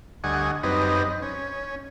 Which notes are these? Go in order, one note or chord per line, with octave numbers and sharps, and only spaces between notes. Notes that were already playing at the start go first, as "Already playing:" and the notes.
D2 G3 D#5 F#5 G#5 C#6
F#2 G3 C4 D#4 B4 D#5
C#4